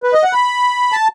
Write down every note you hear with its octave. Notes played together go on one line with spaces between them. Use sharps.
B4
D#5
F#5
B5
A5